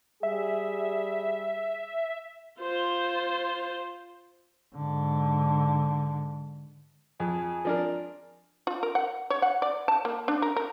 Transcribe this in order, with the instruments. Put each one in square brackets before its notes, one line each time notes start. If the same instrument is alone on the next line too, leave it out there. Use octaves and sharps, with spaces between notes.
[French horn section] G3 G#4 [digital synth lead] E5
[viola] F4 C5
[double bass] G#2 D3
[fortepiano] F2 [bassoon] G#4
[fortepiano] F3 D4 A#4
[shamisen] F4
A#4
F#5
C#5
F#5
D5
A5
A#3
D4
A#4
A#4